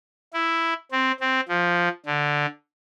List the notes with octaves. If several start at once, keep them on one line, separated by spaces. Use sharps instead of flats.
E4
C4
C4
F3
D3